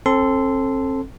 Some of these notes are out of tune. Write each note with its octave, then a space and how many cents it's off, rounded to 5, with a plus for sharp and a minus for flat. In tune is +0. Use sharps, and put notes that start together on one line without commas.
C4 +35 A4 +0 C6 -20